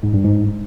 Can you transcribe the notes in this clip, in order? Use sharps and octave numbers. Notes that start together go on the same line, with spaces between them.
G#2
G2
G#2